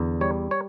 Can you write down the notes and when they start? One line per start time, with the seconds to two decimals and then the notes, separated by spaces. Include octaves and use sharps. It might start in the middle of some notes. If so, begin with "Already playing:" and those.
Already playing: E2 D3
0.21 G3 C#5
0.51 C#5